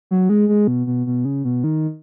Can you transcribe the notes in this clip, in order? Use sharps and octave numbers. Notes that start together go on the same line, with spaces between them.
F#3
G#3
G#3
B2
B2
B2
C#3
B2
D#3